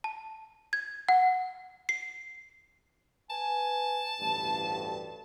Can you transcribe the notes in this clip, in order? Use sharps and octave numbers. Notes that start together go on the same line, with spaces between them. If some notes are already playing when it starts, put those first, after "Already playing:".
A5
G#6
F#5
C7
B4 G#5 A5
A1 D2 G2